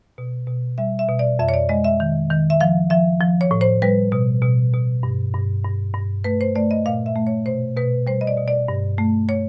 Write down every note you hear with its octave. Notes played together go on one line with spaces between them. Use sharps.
B2
B2
G3 E5
E5
B2
D5
F2 E5
C#5
D5
G#3 D#5
E5
D#3
D#3
E5
F3 F5
F3 E5
F3
C#5
A2
C5
G3 B4
B2
B2
B2
G2
G2
G2
G2
A3 B4
C5
A3 D5
D#5
A#2 F5
E5
A3
C#5
B2 C5
B2 B4
G3 C5
D#5
D5
B2
D5
G2
A3
C#5